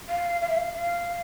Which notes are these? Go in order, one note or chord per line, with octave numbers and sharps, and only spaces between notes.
F5
F5
E5
F5
F5